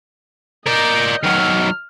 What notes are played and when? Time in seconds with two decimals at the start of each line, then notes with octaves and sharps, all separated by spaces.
0.67 A#4 D5 D#5 G6
1.23 D#3 F#3 F6